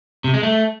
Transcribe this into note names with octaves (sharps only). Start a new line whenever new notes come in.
C3
G#3
A3